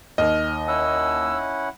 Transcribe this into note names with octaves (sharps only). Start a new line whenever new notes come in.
D#2 D#5 F6
C#4 E4 F#5 E6